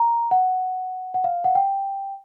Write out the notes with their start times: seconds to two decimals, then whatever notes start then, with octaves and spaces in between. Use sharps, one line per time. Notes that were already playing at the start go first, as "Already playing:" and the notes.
Already playing: A#5
0.31 F#5
1.14 F#5
1.24 F5
1.44 F#5
1.55 G5